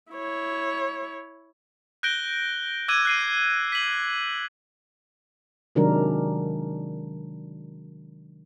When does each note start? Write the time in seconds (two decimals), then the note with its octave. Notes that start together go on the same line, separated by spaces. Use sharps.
0.13 E4 C#5
2.03 F#6 G6 A#6 D7 G7
2.88 D6 E6 F#6 G#6 D#7
3.05 F#6 C7 D#7
3.72 B6 F#7
5.75 C3 D#3 F#3 G#3 D4 A#4